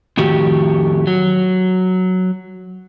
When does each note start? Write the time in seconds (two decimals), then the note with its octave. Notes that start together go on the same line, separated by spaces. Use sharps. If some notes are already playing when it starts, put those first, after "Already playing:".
0.17 F2 A2 D#3 F#4 G4
1.07 F#3